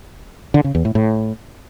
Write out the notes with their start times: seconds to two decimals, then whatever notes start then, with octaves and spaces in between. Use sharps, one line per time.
0.54 D3
0.64 C#3
0.75 E2
0.85 A2
0.95 A2